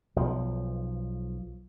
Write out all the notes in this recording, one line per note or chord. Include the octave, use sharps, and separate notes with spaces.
B1 F3